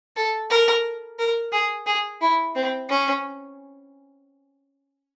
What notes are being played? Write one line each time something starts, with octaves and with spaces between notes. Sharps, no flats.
A4
A#4
A#4
G#4
G#4
E4
C4
C#4